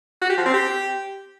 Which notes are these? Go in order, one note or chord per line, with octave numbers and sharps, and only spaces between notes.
F#4
G4
F3
C4
G4